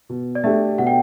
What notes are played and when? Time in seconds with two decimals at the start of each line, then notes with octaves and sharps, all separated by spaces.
0.09 B2
0.35 D5
0.44 A3 D4 G4 E5
0.78 B2 F#5
0.87 G5